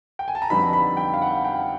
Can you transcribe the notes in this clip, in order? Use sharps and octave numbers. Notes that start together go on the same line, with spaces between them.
G5
G#5
A5
A#5
F2 D3 G3 B3 D#4 B5
B5
G5
F5
F#5
G5